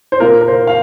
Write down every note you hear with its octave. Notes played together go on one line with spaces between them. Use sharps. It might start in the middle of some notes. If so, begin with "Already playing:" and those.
C5
A#2 A#3 F4 A#4
A#4
C5
F5